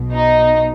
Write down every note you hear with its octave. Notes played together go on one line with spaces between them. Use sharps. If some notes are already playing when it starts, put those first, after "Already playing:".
Already playing: B1 B2
D#4